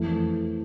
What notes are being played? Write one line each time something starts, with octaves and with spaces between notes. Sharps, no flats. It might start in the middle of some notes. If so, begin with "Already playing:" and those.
Already playing: F2 E3 A3